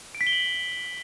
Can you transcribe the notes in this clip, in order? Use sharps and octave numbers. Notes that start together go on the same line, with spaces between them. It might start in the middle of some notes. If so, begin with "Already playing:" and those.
D7
B6
G7
F#7